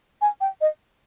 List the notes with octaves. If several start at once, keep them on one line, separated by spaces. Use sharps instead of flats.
G#5
G5
D#5